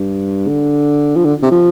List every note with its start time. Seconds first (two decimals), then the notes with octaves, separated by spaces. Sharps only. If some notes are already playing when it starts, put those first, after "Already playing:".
Already playing: G2
0.47 D3
1.16 F3
1.25 D3
1.42 C3
1.51 F3